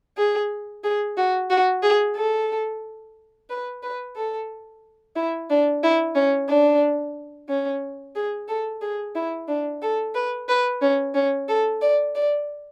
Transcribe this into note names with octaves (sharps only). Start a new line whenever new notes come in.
G#4
G#4
F#4
F#4
G#4
A4
B4
B4
A4
E4
D4
E4
C#4
D4
C#4
G#4
A4
G#4
E4
D4
A4
B4
B4
C#4
C#4
A4
D5
D5